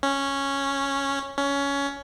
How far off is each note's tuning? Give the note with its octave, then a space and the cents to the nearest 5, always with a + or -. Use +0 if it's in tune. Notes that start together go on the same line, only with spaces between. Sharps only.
C#4 -5
C#4 +15